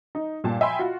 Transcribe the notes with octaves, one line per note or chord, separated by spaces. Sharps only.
D#4
G2 A#2 G5 A5
D#5 E5 G5 G#5 B5 C6
F4 F#4